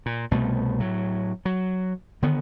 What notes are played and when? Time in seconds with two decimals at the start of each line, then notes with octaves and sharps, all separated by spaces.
0.06 A#2
0.31 C2 B2 A3
0.80 A2 F#3
1.45 F#3
2.22 D3 D#3 B3